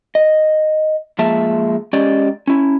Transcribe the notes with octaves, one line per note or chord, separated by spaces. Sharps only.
D#5
F3 G#3 A#3 E5 A5
G#3 C#4 G4 D5 D#5
C#4 E4